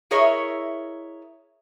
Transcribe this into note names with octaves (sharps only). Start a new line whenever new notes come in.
E4 G#4 A#4 C#5 D#5 E5